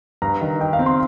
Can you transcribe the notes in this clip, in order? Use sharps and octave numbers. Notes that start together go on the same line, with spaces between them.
G2 A#5
D#3
D#4 G5
F5
C4
C6